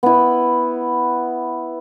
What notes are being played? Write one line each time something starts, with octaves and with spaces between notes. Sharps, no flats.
B3 E4